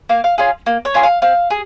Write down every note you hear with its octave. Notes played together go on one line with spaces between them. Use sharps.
A#3 F5
F5
C#4 F4 G#4 F5
A#3
C#5
C#4 F4 G#4
F5
C4 F5
G#4